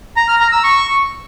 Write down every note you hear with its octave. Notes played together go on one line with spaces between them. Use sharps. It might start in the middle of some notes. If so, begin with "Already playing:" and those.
A#5
F6
A#5
E6
C#6